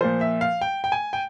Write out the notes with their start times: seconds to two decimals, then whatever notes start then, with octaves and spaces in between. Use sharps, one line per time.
0.01 A#2 F3 C5
0.21 E5
0.41 F5
0.61 G5
0.84 G5
0.92 G#5
1.13 G5